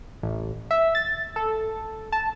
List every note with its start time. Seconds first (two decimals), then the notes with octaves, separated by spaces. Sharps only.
0.23 A1
0.71 E5
0.95 A6
1.36 A4
2.12 A5